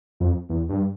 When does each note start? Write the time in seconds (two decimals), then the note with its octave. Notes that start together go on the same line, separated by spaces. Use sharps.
0.20 F2
0.49 E2
0.69 G2